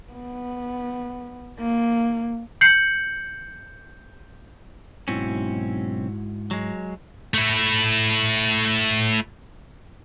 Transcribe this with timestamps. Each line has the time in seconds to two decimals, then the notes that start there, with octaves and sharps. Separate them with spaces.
0.13 B3
1.59 A#3
2.61 G6 C7 C#7 F#7
5.08 B1 G#2 C4 C#4 E4 F#4
6.51 F#3 G#3
7.34 A3 E4